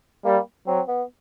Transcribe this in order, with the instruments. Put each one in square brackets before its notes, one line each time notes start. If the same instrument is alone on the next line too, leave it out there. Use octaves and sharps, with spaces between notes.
[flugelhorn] G3 [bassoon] A#3
[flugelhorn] F#3 [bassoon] C4
[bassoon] B3